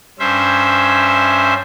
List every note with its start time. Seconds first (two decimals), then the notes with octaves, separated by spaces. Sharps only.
0.19 G2 C#4 C5 E5